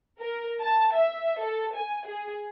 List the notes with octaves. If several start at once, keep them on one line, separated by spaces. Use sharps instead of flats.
A#4
A5
E5
A4
G#5
G#4